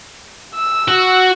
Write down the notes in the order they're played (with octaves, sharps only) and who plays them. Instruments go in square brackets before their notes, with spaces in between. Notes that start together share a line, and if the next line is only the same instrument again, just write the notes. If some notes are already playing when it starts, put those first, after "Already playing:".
[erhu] E6
[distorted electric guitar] F#4